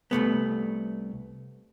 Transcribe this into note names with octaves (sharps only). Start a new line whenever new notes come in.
C2 F2 A3 B3